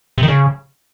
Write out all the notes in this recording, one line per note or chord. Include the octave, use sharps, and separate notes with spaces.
C3
D#3
C#3